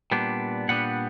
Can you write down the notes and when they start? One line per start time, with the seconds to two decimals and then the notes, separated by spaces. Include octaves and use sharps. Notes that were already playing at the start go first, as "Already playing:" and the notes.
0.11 A#2 G3 B3 D4
0.68 A#2 G3 B3 D4 F#5